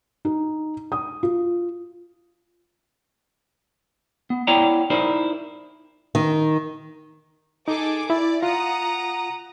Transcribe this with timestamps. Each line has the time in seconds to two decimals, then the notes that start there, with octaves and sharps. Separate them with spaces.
0.25 D#4
0.92 D#6
1.23 F4
4.30 B3
4.47 B3 E4 C#5 D5 G5 A#5
4.90 D#4 E4 A#4 C5 D5
6.15 D#3
7.68 D#4 G#4 A4 D6
8.10 E4 D5
8.43 F4 F#5 A#5 D#6